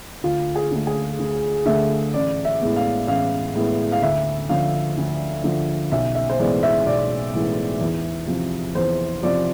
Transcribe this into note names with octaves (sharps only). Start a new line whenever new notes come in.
D2 F4
G#4
D3 A3
G#4
D2
D3 A3 E5
A1 D5
E5
A2 G#3 B3
F5
A1 F5
A2 G#3 B3
F5
D2 E5
D3 F3 F5
D2
D3 F3
B1 E5
E5
C5
A2 E3 G#3 B3 D5
E5
B1 D5
A2 E3 G#3 B3
E2
C3 F3
E2 C5
C3 F3 D5